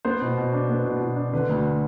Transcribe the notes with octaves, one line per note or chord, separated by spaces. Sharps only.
B3 C5
B2
B2
D4
B3
B2
B2
D4
D3 B4
D2